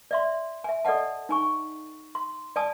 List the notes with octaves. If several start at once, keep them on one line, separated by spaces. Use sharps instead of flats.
D5 E5 C6
E5 G#5
A4 D5 D#5 F#5 A5
D#4 G#5 C#6
C6
D5 G#5 A5 D#6